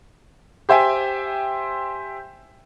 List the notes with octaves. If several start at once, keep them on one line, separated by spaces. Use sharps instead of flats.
G4 C5 E5 G5 G#5